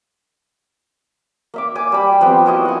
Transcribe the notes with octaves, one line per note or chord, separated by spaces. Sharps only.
A#3 E5 D6
G#5 D6
G3 B5
F3 B3 C4 G4
A#3 E4 F#4 D#5
F#5 G#5